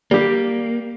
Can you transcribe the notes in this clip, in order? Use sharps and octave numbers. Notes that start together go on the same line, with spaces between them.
G3 A#3 G4